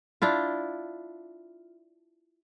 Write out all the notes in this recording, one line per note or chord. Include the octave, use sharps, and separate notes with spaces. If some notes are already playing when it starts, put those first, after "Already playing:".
D4 E4 F4